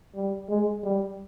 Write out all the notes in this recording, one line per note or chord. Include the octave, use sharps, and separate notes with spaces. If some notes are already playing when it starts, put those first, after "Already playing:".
G3
G#3
G3